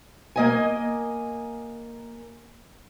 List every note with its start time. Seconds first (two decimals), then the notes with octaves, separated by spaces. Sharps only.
0.36 A#3 D#5 G#5